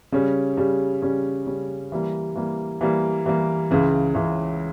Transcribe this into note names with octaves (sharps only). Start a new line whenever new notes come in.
C#3 G3 C#4
C#3 G3 C#4
C#3 G3 C#4
C#3 G3 C#4
E3 G3 A#3
E3 G3 A#3
E3 G3 A#3
E3 G3 A#3
C#2 C#3 E3
C#2 C#3 E3